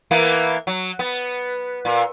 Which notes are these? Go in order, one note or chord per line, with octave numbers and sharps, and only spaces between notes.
E3 A#3 B3
F#3
B3
A#2